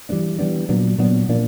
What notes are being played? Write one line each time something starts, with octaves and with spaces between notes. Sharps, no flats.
E3 G3 B3 D4
E3 G3 B3 D4
A#2 F#3 B3 D4
A#2 F#3 B3 D4
A#2 F3 A#3 D4